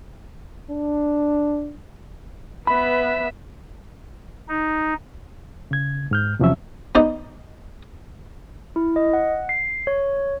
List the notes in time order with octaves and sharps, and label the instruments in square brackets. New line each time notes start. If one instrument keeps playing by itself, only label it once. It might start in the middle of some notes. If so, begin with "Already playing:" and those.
[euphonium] D4
[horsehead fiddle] B3 B4 [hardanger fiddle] E5 [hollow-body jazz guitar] B5
[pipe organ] D#4
[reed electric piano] C#3 G#6
G#2 F6 G6
E2 C3 F3 F#3 C#4 E5
[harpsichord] B3 D#4 C5 D5
[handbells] E4
D#5
F#5
C7
C#5